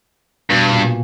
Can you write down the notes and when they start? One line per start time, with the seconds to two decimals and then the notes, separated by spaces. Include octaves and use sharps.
0.50 G2 B2
0.72 A#2